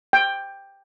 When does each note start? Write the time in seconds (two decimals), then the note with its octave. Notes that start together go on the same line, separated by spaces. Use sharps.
0.13 G5